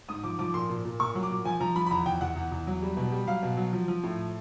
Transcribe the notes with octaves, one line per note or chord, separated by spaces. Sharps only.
G#2 D#6
F3 D6
F3 D6
A#2 C6
A#2
A#2
A#2 C#6
F#3
D6
A#2
F3 G#5
F3 A#5
F3 B5
B5
E2 A#5
E2 G5
E2 F#5
E2
E2
F#3
G3
B2
G3
F#3 F5
B2
F#3
F3
F3
A2